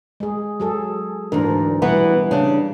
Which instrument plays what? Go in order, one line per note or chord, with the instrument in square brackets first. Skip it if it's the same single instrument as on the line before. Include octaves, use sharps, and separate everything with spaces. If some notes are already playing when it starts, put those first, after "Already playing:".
[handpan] G#3 G#4
F#3 G#4 A4
[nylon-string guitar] D2 G#2 [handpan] E3 D4 A#4
[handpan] B2 G3 F#5 [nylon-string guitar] E3 B3
[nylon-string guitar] C#3 D4